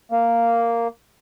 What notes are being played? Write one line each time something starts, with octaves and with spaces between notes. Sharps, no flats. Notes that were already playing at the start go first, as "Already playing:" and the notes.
A#3